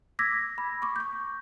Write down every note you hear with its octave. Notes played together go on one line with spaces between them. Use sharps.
D6 E6 G#6 A#6 B6
B5
C#6 D6
C#6 G6